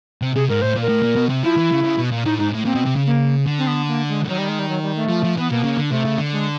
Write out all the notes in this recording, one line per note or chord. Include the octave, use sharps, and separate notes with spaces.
C3
C3 G#4
G#2 A#4
A2 C5
A#2
A#4
A2
A#2
B2
C3
F3 E4
E3
C#3
C#3
B2
A#2
A2 D#4
G#2 D#4
A2
A#2 C4
B2
C3
C#3
A#3
D3
C4
B3
A#3
G#3
D3
D#3 F#3
G3
G#3
G3
F#3
G3
A3
F3
F3
E3 B3
B2 A#3
C#3
D3
C3 A3
C#3
D3
G#3